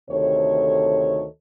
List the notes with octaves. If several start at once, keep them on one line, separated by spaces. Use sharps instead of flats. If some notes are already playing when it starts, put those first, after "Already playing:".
D2 C3 D#3 A4 C#5